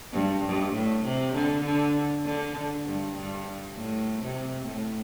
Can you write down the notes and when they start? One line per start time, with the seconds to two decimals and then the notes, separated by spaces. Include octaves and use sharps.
0.13 G2
0.44 G2
0.73 A2
1.04 C3
1.35 D3
1.65 D3
2.26 D3
2.86 G2
3.16 G2
3.76 A2
4.22 C3
4.67 A2